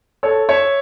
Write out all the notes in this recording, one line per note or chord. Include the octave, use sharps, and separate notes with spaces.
A4 C#5
C#5 E5